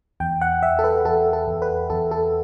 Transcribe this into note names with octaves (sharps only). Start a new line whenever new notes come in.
E2 G5
F#5
E2 E5
A4
B4
E2 A4
A4
E2
B4
E2 A4
A4